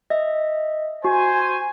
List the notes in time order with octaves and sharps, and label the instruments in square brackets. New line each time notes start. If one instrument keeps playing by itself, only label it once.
[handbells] D#5 E5
[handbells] F#4 [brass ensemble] C5 G#5